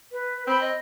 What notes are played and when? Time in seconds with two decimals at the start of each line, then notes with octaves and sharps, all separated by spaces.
0.11 B4
0.47 C4 B5
0.61 D#5